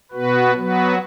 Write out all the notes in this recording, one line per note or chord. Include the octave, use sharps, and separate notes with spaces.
B2 B3 F#4 B4
F#3 B3 F#4 B4